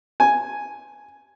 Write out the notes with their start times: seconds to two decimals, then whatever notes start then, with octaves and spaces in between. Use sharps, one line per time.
0.20 G#5